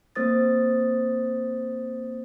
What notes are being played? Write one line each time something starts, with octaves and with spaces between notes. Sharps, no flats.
A#3 C4 C5 D#6 A6